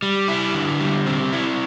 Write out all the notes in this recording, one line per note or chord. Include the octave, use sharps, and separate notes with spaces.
G3
E4
D3
G3
C4
E4